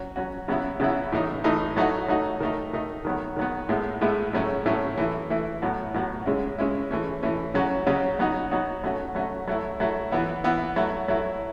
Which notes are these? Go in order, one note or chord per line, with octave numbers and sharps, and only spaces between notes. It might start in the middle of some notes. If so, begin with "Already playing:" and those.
Already playing: F#3 C#4 F#4
F#3 C#4 F#4
C#3 F#3 B3 E4
C#3 F#3 B3 E4
A2 E3 A3 D#4
A2 E3 A3 D#4
F#3 A3 D#4 F#4
F#3 A3 D#4 F#4
D#3 A3 D#4
D#3 A3 D#4
D#3 F#3 B3
D#3 F#3 B3
A2 G#3 B3 E4
A2 G#3 B3 E4
A2 F#3 A3 C#4 E4
A2 F#3 A3 C#4 E4
E3 A3 E4
E3 A3 E4
A2 F#3 B3 F#4
A2 F#3 B3 F#4
C#3 G#3 C#4 E4
C#3 G#3 C#4 E4
E3 A3 C#4
E3 A3 C#4
C#3 F#3 C#4 F#4
C#3 F#3 C#4 F#4
F#3 B3 D#4 F#4
F#3 B3 D#4 F#4
F#3 A3 C#4 F#4
F#3 A3 C#4 F#4
F#3 A3 E4
F#3 A3 E4
E3 B3 E4
E3 B3 E4
F#3 A3 E4
F#3 A3 E4